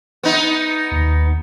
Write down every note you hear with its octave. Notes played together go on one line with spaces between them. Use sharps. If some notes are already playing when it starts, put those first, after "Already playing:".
B3 D#4
D#2